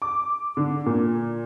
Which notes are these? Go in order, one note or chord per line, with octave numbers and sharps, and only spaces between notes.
D6
D3
A#2